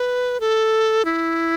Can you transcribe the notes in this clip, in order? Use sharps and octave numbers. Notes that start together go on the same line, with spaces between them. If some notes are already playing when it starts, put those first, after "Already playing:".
Already playing: B4
A4
E4